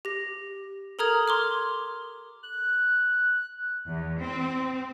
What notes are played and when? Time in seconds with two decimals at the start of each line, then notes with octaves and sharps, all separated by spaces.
0.05 G4 A#6
0.99 A4 A#4 A#5 D#6 F6 G#6
1.28 C6 D6 F6
2.43 F#6
3.88 E2
4.19 C4